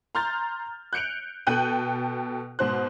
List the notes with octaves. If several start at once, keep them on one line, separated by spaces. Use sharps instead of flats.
A#5 C6 F6 G6 A6
F#6 G6 C#7 D7 F7
B2 A4 G5 F#6 G6 D#7
G#2 B2 C5 F#6